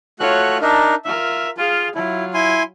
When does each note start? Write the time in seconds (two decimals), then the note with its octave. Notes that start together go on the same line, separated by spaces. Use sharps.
0.20 A3 F4 F#4 C#5 F#6
0.61 D4 D#4 A#4 E5 A5
1.05 F4 A#4 E5
1.58 F4 G#4 F5
1.95 F#3 E4 F4
2.34 E4 G#5 C6